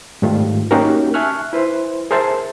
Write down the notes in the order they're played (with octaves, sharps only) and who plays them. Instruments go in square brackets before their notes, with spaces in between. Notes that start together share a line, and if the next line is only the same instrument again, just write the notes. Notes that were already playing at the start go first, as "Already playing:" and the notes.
[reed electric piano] G#2 D#3 G3 A3 F4
A#3 C#4 D#4 F#4 G4 A#4
E5 G#5 A5 C#6 F6 F#6
E4 B4 C5
G#4 A#4 C5 E5 G#5 A5